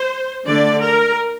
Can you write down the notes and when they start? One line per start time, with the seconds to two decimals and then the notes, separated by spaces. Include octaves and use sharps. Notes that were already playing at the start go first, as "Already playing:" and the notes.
Already playing: C5
0.45 D3 A3 D4 D5
0.81 A#4